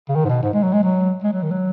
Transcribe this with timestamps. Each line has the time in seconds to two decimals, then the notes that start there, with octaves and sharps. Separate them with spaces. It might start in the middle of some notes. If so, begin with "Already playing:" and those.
0.09 C#3
0.15 D#3
0.25 G#2
0.29 B2
0.43 G#2
0.54 G#3
0.63 F#3
0.73 G#3
0.83 F#3
1.24 G#3
1.33 F#3
1.42 D#3
1.51 F#3